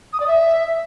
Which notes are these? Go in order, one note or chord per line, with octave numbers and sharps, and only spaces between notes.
D#6
D5
E5